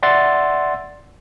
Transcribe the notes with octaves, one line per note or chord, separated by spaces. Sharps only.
D5 E5 F#5 C6 E6 A6